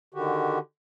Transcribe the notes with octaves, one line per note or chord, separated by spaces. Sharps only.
D3 D#3 F#4 G4